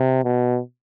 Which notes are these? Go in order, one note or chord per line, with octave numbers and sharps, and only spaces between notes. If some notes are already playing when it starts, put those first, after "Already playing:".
Already playing: C3
B2